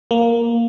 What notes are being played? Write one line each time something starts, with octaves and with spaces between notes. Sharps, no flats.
A#3